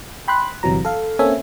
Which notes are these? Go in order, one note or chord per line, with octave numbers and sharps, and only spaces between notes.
G5 B5 C6 F#6
G1 C3 E3 F#3 A#5
A4 F5
A#3 C4 C#4 A4 E5 G#5